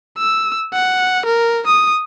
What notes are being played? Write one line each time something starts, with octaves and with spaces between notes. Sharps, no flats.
E6
F#5
A#4
D#6